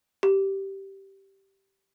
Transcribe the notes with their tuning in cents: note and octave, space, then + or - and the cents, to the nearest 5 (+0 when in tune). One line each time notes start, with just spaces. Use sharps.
G4 -10